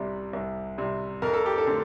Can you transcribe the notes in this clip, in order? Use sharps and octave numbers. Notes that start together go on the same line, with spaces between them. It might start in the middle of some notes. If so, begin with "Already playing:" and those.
Already playing: C2 C3 G3
C2
C3 G3
F2 A#4
A4
G4
A4
D3 A3 C4